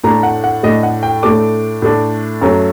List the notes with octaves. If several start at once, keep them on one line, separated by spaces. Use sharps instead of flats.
A2 A3 D4 A#5
F#5
F#5
A2 A3 D4 D#5
F#5
G5
A2 A3 D4 D6
A2 A3 D4
F#2 F#3 A3